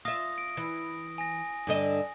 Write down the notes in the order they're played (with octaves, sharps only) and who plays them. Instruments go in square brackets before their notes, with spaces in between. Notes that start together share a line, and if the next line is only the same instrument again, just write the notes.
[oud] F4 E5 [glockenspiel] D#6 A#6
[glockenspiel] D7
[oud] E3
[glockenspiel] G#5 A#6
[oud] G2 D3 D#5